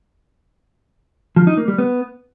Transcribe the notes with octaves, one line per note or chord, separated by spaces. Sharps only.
F3
D#4
A#3
G3
B3